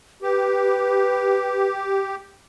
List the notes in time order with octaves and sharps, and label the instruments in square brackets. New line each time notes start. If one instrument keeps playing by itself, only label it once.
[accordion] G4 [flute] B4